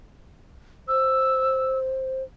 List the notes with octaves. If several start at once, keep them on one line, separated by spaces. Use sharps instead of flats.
C5 E6